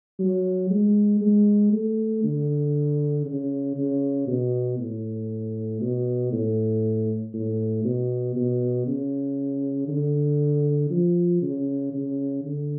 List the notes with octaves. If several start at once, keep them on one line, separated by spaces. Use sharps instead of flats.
F#3
G#3
G#3
A3
D3
C#3
C#3
B2
A2
B2
A2
A2
B2
B2
C#3
D3
F3
C#3
C#3
D3